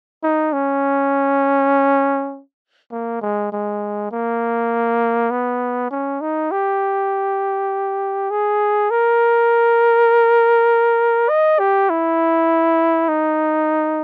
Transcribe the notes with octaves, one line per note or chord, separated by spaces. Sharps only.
D#4
C#4
A#3
G#3
G#3
A#3
B3
C#4
D#4
G4
G#4
A#4
D#5
G4
E4
D#4